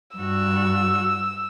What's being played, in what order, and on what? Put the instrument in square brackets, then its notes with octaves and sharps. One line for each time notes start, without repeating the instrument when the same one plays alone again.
[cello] G2 F#4 [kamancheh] E6